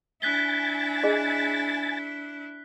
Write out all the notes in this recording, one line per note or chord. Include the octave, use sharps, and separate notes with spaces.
D4 E4 G#5 F#6 A6 B6 G7
G#4 D#5